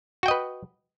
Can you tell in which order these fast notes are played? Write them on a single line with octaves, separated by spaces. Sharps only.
F#4 G5 D#5 B4